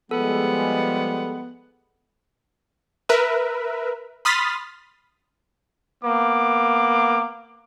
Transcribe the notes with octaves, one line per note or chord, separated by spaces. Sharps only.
F3 G3 G#3 B3 A4
A#4 B4 E5
B5 C6 D#6 F6 A6 B6
A#3 B3 D6